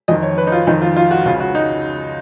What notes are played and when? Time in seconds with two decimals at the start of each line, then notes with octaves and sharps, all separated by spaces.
0.08 F2 D#3 D#5
0.23 C#5
0.38 B4
0.47 D#4
0.52 F4
0.67 F2 D#3 D#4
0.82 F4
0.96 F4
1.11 F#4
1.25 C#2 C#3 F4
1.40 F#4
1.55 D#4